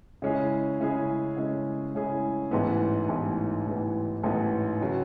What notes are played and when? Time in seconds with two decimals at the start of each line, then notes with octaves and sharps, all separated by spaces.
0.22 C#3 G#3 C#4 E4 G#4
0.80 C#3 G#3 C#4 E4 G#4
1.37 C#3 G#3 C#4 E4 G#4
1.95 C#3 G#3 C#4 E4 G#4
2.51 A1 G#2 E3 B3
3.09 A1 G#2 E3 B3
3.66 A1 G#2 E3 B3
4.23 A1 G#2 E3 B3
4.82 C#3 F#3